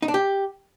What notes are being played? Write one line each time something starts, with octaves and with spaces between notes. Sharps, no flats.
D#4
D4
G4